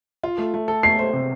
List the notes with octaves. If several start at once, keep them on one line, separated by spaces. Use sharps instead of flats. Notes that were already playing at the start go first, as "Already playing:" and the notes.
F4
A3
A3
A4
A3 C7
C5
C3